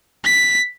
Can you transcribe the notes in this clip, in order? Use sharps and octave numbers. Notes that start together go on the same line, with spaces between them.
B6